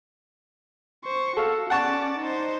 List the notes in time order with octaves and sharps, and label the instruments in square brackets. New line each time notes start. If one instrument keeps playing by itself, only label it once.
[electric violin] C5 C#6
[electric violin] F#4 [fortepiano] A4 F5
[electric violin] C#4 D5 [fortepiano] F#5 A5 C#6
[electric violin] D#4 C5